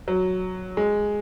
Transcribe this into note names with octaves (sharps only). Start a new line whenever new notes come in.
F#3
G#3